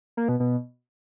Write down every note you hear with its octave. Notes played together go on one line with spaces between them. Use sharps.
A#3
B2
B2